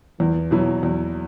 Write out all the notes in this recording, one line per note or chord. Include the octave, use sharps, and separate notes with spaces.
E2 E3
B2 F#3 E4
E2 F#3